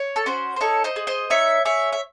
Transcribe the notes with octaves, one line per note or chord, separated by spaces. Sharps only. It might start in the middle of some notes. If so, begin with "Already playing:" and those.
Already playing: C#5
A4
C#4 F#4 C5
C5
D#4 A4 C#5
C5 D#5
G#4
C5 D#5
D#4 C#5 E5
G#4 C#5 E5
E5